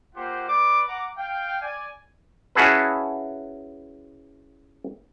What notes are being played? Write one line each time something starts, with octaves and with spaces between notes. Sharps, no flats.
A#3 F4 G4 C5 F#5
B4 D5 D6
F#5 A#5 D6
F5 G5
D5 G#5
C#4 E4 F#4 G#4 A4 B4